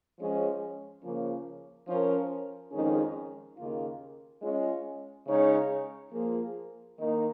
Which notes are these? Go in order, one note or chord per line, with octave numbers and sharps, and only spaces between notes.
F3 G#3 C#4
C#3 F3 A#3 C#4
F3 C#4 A#4 C#5
F2 D#3 G#3 C#4 G#4
D#2 C#3 A#3 F4
G#3 C#4 F4 G#4 C#5
C#3 G#3 D#4 C#5
F3 A#3 F4 G#4
D#3 A#3 D#4